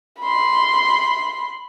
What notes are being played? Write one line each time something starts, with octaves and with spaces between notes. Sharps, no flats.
B5 C6